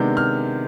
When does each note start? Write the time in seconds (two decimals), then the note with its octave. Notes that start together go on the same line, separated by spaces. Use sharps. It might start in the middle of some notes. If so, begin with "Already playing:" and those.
Already playing: C3 D#3 G#3 B3 D4 G6
0.17 F6